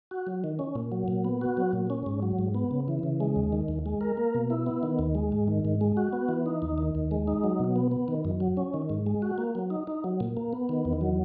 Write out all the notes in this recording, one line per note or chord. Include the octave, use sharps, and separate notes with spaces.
F#4
F#3
D#3
C#4
A#2
F#3
A#2
B3
F#4
F#3
A#2
C#4
G#2
F#3
G#2
B3
C#3
E3
C#3
G#3
D#2
D#3
D#2
G#3
A#4
A#3
B2
E4
B3
D#3
D#2
G#3
G#2
D#3
G#2
G#3
F#4
B3
E3
D#4
D#2
D#3
D#2
G#3
D#4
F#3
B2
B3
B3
D#3
F#2
F#3
C#4
D#3
G#2
G#3
F#4
A#3
F#3
D#4
D#4
F#3
A#2
A#3
B3
D#3
E2
F#3